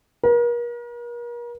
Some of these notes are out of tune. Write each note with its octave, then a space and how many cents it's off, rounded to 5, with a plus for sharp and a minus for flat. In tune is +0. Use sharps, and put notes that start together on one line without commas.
A#4 +40